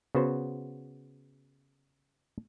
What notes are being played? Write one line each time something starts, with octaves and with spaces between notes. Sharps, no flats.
C#3 B3 F#4 C5